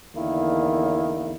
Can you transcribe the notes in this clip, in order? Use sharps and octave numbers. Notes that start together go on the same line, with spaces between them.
E2 D3 D#3 A#3 E4